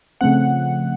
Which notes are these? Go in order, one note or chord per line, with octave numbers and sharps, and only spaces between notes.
C#3 F3 A3 C4 F#5